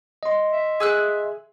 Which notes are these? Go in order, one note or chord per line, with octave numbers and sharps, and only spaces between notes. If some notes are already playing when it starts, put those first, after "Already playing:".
D#5 C6
E5
G#4 E6 F#6